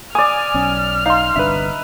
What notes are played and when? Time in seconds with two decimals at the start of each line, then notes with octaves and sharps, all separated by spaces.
0.15 D5 G#5 D#6 F6
0.54 B1 C#4
1.06 D#4 F5 C6
1.36 G1 C2 D4 B4 E5